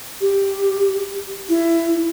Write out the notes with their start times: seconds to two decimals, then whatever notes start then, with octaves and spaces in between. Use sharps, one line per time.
0.21 G4
1.49 E4